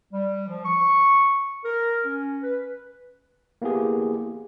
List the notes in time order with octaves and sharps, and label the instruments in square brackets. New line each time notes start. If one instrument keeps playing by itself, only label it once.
[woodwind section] G3
F3
C#6
A#4
C#4
B4
[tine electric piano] A#3 B3 E4 G4 G#4